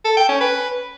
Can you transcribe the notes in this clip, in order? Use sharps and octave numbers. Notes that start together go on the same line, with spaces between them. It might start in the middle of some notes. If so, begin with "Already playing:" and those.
A4
G5
C#4
B4